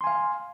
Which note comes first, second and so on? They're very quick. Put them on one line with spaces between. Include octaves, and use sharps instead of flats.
C6 G#5 F5